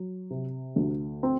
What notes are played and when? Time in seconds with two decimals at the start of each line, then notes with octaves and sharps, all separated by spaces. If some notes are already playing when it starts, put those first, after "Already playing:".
Already playing: F#3
0.30 C3
0.76 D2
1.23 C4